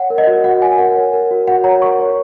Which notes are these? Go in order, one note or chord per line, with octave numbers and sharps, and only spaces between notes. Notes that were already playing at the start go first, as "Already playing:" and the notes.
Already playing: C#5 F#5
A#4
D#5
F#4
F#4 F#5
C#5 G#5
A#4 F#5
C#5
A#4
F#4
F#4 F#5
C#5 A#5
A#4 C#6
C#5